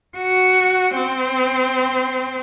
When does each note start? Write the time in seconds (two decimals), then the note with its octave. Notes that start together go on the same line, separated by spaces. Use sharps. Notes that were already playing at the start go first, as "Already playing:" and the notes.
0.18 F#4
0.96 C4